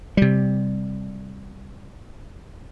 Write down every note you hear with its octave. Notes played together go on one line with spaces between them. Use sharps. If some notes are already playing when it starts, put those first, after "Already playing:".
C3 G3